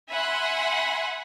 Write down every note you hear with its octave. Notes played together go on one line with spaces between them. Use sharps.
E5 F#5 G#5 B5 C6